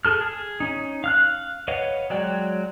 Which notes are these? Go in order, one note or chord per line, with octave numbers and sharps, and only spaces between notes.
G#4 A4 F6
G#4
C#4 D#4
F5 F6 F#6
B4 C#5 D#5 F5 F#5
F#3 G#3 D5 G5